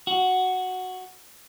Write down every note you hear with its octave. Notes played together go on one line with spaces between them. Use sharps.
F#4